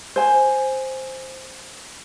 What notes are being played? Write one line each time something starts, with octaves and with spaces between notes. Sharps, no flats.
C5 G#5